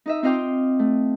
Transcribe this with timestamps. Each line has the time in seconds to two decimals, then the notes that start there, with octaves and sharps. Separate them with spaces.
0.06 D#4 D#5 E5
0.23 C4 F4 D#5 F5 G5 D6
0.79 A3